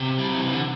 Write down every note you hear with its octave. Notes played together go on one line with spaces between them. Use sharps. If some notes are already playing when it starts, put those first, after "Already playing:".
Already playing: C3
G3
F#3
E3
D3